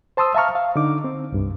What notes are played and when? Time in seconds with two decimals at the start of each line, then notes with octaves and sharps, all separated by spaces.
0.17 C5 A5 C6 D#6 E6
0.35 E5 F5 A5 A#5 C#6 F6
0.55 F5
0.76 D3 D#4 D6
1.04 C4
1.32 C2 G2